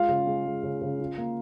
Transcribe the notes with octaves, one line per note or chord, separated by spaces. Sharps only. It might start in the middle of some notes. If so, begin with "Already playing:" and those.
Already playing: G#3 F4 F5
C#3
G#3
G#3
C#3
C#3
F4
A#3